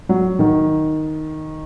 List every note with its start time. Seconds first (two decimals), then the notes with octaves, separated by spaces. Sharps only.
0.09 F#3
0.39 D#3